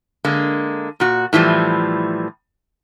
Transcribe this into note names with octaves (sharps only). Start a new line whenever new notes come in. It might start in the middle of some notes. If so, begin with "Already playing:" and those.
D3 G#3 A#3
A#2 F#4
A2 E3 F3 G3